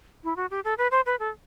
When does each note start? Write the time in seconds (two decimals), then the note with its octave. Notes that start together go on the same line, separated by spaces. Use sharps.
0.24 E4
0.36 F#4
0.51 G4
0.64 A4
0.78 B4
0.91 C5
1.06 B4
1.19 A4